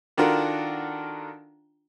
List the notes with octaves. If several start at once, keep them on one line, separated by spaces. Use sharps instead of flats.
D#3 D4 F4 F#4 A4 A#4